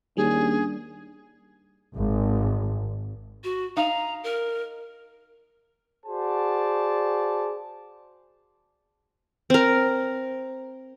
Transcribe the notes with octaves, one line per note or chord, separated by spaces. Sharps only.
D#2 G3 C#4 D4 G#4
G#1
F#4
D#4 F5 A#5
A#4
F#4 G#4 C5 D5 A5
C4 A#4